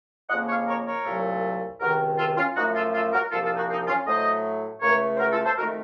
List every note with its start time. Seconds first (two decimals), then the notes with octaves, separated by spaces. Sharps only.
0.30 F2 C#3 F3 A#3 D#5 F#5
0.48 C#5 F5
0.68 A#4 C#5
0.86 A#4 C#5
1.05 C2 A#2 F#3 A3
1.80 C#2 C3 D#3 F#4 A#4
2.18 F4 A4
2.37 C#4 F4
2.56 F#2 F3 A3 D#4 F#4
2.75 F4 A4
2.94 F4 A4
3.13 F#4 A#4
3.31 C2 A#2 F3 A#3 F4 A4
3.43 F4 A4
3.57 D#4 F#4
3.69 C4 D#4
3.88 C#4 F4
4.06 A2 F#3 A3 C5 D#5
4.82 C#2 C#3 A3 A#4 C#5
5.16 C5
5.20 F#4 A#4
5.32 F4 A4
5.45 A4 C5
5.57 F2 D#3 A3 F#4 A#4